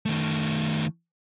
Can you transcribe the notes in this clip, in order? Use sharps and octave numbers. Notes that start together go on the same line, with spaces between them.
D#3 A3